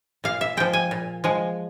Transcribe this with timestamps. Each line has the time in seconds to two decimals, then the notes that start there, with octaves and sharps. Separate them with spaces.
0.24 A#2 F5
0.41 E5
0.57 F3 G#3 G5
0.73 G#5
0.91 A#2
1.24 F3 G#3